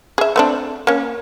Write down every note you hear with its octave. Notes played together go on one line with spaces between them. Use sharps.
G#4 E5
A3 C4 D4
A#3 C#4